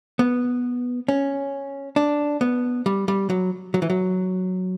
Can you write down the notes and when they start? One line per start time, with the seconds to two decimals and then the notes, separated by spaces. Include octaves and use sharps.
0.19 B3
1.08 C#4
1.96 D4
2.41 B3
2.86 G3
3.08 G3
3.30 F#3
3.74 F#3
3.82 E3
3.90 F#3